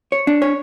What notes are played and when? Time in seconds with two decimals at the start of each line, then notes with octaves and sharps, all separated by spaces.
0.12 C#5
0.27 D4
0.42 C#5